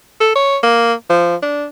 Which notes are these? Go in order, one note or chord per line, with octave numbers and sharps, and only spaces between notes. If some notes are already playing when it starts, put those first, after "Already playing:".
A4
C#5
A#3
F3
D4